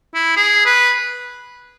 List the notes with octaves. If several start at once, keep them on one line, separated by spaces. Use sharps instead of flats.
E4
G#4
B4